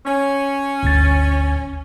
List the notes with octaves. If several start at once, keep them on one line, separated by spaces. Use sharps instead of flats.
C#4
G1 D2 A6